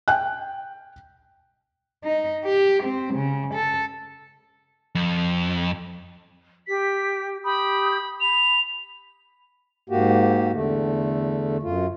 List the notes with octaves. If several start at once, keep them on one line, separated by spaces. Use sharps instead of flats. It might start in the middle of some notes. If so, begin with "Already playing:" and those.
G5 F#6
D#4
G4
C4
C#3
A4
F2
G4 B6
G4 B5 D#6 G6
B5 F7
G#2 A#3 F#4 G4
E2 D3 A3
F#2 F4